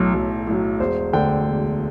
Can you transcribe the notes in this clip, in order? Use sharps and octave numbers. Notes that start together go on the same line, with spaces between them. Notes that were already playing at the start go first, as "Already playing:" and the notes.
Already playing: B1 A2 F#3
B1
A2 F#3
E1 C5
D2 D3 G5
E1